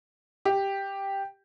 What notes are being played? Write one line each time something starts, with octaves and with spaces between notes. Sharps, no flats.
G4